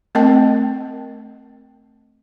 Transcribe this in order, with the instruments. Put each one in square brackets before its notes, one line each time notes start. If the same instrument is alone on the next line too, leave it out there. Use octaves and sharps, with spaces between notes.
[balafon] A3 C4 A#4 D#5 G5 A5